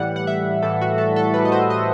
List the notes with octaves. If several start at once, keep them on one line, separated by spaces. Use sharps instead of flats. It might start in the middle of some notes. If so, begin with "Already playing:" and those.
Already playing: A2 E3 G3 F#5
F#5
E5
A2 E3 G3 A4
F#4
A4
A4
A2 E3 G3 B4
D#5
C5
D#5